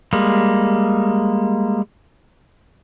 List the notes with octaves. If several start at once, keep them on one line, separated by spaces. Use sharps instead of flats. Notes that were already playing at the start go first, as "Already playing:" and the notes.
G3 G#3 A#3